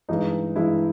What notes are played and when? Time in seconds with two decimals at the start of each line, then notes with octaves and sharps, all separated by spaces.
0.09 G2 E3 G#3 D#4
0.56 G2 E3 G#3 E4